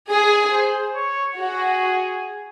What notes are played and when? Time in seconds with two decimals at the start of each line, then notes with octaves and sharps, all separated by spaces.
0.10 G#4
0.52 C5
0.95 C#5
1.37 F#4 G#4